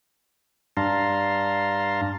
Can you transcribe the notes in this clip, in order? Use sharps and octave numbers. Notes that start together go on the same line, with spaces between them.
G2 D4 F5 A5 A#5 C6